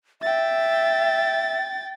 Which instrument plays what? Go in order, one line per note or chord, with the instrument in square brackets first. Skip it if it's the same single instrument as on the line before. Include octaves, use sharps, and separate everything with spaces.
[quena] E5 [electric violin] G5 A6